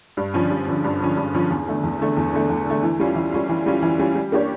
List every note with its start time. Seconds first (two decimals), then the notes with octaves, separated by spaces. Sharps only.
0.17 G2
0.34 D3 F3 C#4
0.50 G2
0.67 D3 F3 C#4
0.84 G2
1.00 D3 F3 C#4
1.17 G2
1.34 D3 F3 C#4
1.50 E2
1.67 D3 A3
1.83 E2
2.00 D3 A3
2.17 E2
2.33 D3 A3
2.49 E2
2.66 D3 A3
2.83 E3
3.00 G3 C#4 F4
3.16 E3
3.32 G3 C#4 F4
3.49 E3
3.66 G3 C#4 F4
3.82 E3
3.99 G3 C#4 F4
4.15 G3
4.32 A#3 D4 G4 C#5